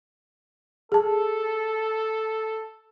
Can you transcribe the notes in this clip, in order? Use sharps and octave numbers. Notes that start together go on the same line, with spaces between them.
G#4 A4 A5